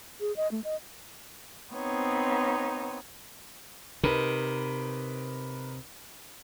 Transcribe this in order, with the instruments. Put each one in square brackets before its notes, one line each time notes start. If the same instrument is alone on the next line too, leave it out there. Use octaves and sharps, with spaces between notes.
[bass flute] G#4
D#5
A3
D#5
[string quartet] B3 C4 D#4 C#5
[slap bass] C3 [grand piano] D#4 A#4 B4